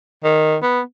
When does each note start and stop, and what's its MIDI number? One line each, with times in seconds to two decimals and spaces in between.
0.24 0.57 51
0.63 0.81 59